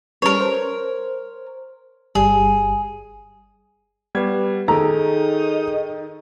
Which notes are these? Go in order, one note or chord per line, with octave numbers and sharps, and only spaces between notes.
G3 C#4 A#4 B4 C#5
C5
G1 G3 G#4
G3 B3 B4 G#6
D#3 D#4 G#4 A4 A#5